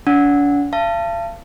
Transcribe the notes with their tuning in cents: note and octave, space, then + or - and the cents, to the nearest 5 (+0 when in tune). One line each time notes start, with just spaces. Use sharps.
D4 -45 F#5 -15
F5 -40 A5 +15